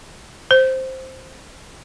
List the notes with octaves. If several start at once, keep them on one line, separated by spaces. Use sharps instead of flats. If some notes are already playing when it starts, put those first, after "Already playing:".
C5